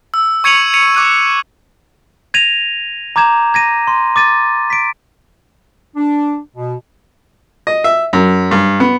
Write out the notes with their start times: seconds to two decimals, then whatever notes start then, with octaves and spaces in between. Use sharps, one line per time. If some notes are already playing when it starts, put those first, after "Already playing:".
0.14 E6
0.44 C#6 G#6 C#7 D#7 F7 F#7
0.74 C#7 D#7 F7
0.95 D6 F#6 D#7
2.34 G#6 A#6 D#7 F7
3.16 A#5 D6 G6 G#6 E7
3.54 G#6 A#6 D#7
3.87 C6
4.16 D6 A6 D#7
4.70 B6 D7
5.96 D4
6.56 B2
7.67 D#5
7.84 E5
8.13 F#2
8.51 G2
8.80 B3